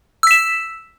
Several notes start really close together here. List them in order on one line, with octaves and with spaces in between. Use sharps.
E6 B6 E7